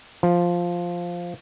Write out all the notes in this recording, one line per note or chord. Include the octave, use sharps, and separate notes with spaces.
F3